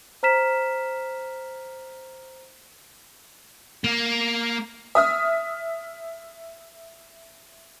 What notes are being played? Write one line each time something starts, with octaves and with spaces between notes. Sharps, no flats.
C5 A#5 F6 B6 E7
A#3
E5 D#6 F6